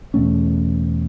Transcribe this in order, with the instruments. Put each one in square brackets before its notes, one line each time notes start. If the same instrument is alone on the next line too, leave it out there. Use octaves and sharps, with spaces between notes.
[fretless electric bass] E2 B2 A3 C#4